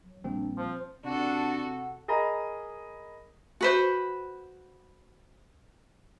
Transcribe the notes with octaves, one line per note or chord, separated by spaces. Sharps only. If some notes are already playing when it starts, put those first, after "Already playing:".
F#3
A#1 G3 A#3 C4 D4
F3 C5
C3 D4 F#4 A4 F#5
G#4 A#4 D#5 A#5 B5
F#4 B4 C5